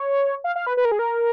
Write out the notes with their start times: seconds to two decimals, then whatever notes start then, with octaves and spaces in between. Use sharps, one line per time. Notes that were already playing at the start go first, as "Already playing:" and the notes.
Already playing: C#5
0.44 F5
0.56 F5
0.67 B4
0.77 B4
0.85 A#4
0.92 G#4
0.99 A#4